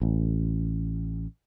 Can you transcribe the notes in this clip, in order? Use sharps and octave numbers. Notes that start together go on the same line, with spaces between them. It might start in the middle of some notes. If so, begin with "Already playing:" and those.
A1